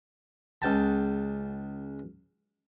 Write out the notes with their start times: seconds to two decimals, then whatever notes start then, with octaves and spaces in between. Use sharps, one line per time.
0.62 C#2 G5 A5